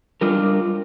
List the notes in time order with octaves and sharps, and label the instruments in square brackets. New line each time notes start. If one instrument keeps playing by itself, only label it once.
[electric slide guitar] G3 D4 F4 A#4